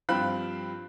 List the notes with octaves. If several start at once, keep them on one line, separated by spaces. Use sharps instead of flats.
G2 F3 C4 F5 B5 F#6